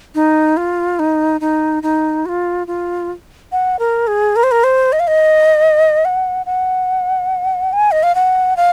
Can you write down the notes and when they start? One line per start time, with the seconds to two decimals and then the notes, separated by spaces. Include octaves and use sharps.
0.15 D#4
0.57 F4
0.99 D#4
1.41 D#4
1.83 D#4
2.26 F#4
2.29 F4
2.67 F4
3.52 F#5
3.79 A#4
4.07 G#4
4.36 A#4
4.43 C5
4.51 A#4
4.64 C5
4.92 D#5
5.00 F5
5.07 D#5
6.05 F#5
6.46 F#5
7.73 G#5
7.91 D#5
8.03 F5
8.15 F#5
8.57 F5